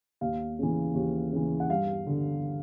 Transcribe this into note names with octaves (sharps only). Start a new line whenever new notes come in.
D#2 F5
C#3 E3
D#2
C#3 E3
F#5
G2 F5
D3